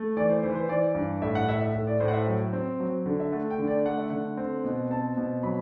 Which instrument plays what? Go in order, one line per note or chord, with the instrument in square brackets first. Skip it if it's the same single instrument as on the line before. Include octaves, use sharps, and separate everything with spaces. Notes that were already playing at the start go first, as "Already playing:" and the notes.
Already playing: [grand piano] A3
E3 D5
C5
E3 C5
B4
C5
E3 D5
G2
A2 E5
F#5
A2 E5
E5
A2
D5
A2 C5
F#5
E5
F#3 G5
C4
F#3
D3
E5
A3 F#5
G5
D3
D5
A3 F#5
E5
D3 F#5
C4
B2
C4 A5
B2
F#3 B5